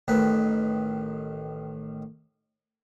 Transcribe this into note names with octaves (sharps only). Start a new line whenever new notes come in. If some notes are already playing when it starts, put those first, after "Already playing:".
A1 D#3 B4